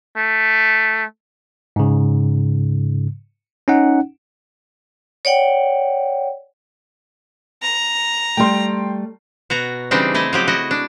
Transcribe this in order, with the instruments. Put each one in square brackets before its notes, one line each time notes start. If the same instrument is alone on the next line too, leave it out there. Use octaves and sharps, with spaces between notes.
[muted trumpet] A3
[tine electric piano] G#2 C#3
C#4 D#4 F#5
[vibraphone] C#5 D5 F#5 G5
[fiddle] A#5
[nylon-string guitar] G3 A3 [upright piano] G5 C6
[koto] B2 F#4 A#5
C#3 E3 G3 C4 D4 D#4
A3 E4 D#5
F3 F#3 G4
E4 F#4 D#5
D4